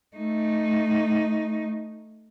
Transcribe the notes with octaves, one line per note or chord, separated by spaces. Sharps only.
A3 D#4